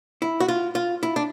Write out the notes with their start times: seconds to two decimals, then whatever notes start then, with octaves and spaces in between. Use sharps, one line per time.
0.22 E4
0.40 F#4
0.48 F4
0.75 F4
1.03 E4
1.16 D4